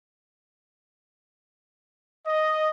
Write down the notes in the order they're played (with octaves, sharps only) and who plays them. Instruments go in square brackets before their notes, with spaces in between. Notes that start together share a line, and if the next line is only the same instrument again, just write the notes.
[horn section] D#5